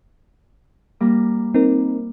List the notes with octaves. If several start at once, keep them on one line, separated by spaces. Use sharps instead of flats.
G3 A#3 A#5
C4 D#4 A#4